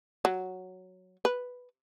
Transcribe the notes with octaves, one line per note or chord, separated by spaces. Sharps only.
F#3
B4